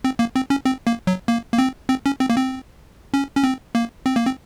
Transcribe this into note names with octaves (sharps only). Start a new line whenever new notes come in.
C4
A#3
C4
C#4
C4
A#3
F#3
A#3
A#3
C4
C4
C#4
C4
A#3
C4
C#4
C#4
C4
A#3
C4
A#3
C4